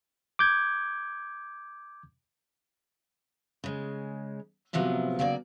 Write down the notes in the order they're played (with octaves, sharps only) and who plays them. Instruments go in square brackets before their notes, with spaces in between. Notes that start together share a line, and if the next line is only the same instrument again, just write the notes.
[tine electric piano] D6 G6 G#6
[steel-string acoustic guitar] C#3 G#3
A2 C3 F3 F#3 B3
C#3 F#3 A#3 C5 D5